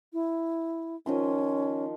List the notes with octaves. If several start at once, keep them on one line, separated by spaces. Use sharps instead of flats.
E4
D#3 F3 C#4 C6